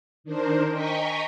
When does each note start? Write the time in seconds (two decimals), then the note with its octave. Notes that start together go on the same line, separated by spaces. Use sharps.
0.24 D#3 D4 A#4 C5
0.71 D#5 G5 G#5 A#5 C#6 B6